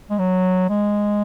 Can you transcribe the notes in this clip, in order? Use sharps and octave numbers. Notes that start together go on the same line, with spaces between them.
G#3
F#3
G#3